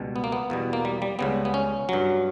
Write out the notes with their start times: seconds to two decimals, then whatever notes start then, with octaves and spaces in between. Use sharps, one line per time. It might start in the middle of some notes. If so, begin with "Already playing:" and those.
Already playing: C#2 B2 G3
0.16 B3
0.24 A#3
0.32 B3
0.50 E2 B2 G3
0.73 A#3
0.85 G3
1.02 G3
1.19 C#2 C#3 G3 B3
1.45 B3
1.54 C#4
1.89 G2 F#3